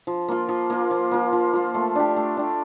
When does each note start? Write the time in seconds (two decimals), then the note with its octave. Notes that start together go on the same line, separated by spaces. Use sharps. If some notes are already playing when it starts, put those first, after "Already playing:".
0.07 F3
0.28 A#3 F4
0.49 F3
0.70 A#3 F4
0.91 F3
1.11 A#3 F4
1.33 F3
1.53 A#3 F4
1.74 A3
1.95 D4 G4
2.16 A3
2.37 D4 G4